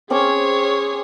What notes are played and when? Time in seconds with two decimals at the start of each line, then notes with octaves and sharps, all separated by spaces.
0.10 C4 C#4 G#4 C#5 D6